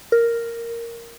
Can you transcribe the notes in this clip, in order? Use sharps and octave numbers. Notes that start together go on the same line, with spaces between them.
A#4